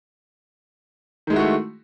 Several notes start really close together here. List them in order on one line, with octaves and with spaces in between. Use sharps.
D#3 G#3 E4 F#4 A3